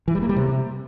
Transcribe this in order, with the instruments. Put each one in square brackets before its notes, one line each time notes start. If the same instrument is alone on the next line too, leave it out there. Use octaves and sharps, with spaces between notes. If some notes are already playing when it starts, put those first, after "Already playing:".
[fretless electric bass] E3
G3
A#3
G3
C3